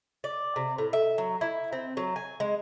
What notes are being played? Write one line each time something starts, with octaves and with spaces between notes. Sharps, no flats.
D5
C3
A2
E5
F#3
E4
C4
F#3
G#5
G#3